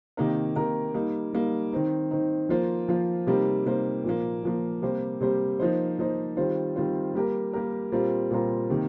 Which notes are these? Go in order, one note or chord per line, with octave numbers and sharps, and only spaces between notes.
C3 D#3 A#3 D#4 A#4
C3 D#3 A#3 D#4 A#4
G3 A#3 D#4
G3 A#3 D#4
D#3 C4 D#4
D#3 C4 D#4
F3 A#3 F4 C5
F3 A#3 F4 C5
C3 G3 A#3 D#4 C5
C3 G3 A#3 D#4 C5
A#2 F3 A#3
A#2 F3 A#3
C3 G3 A#3 G4 C5
C3 G3 A#3 G4 C5
F3 A#3 D#4 C5
F3 A#3 D#4 C5
D#3 G3 C4 F4 C5
D#3 G3 C4 F4 C5
G3 A#3 G4 A#4
G3 A#3 G4 A#4
A#2 G3 C4 F4 A#4
A#2 G3 C4 F4 A#4
C3 D#3 A#3